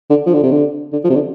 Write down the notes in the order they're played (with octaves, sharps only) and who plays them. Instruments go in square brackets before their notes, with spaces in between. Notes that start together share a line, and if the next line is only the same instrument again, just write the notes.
[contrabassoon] D3
F3
D3
C3
D3
D3
F3
C3
D3